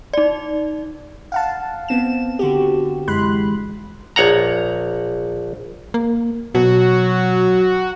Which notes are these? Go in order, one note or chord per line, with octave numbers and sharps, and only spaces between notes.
D#4 D5
F5 F#5 A5
B3 C4 E7
D3 F#4 G4
F#2 E3 G#3 B5 C6 F#6
A#1 C#5 F#5 A#5
A#3
B2 F#3 F#4